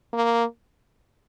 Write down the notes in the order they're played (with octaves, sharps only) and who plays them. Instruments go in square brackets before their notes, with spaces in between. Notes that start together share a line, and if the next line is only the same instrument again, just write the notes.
[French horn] A#3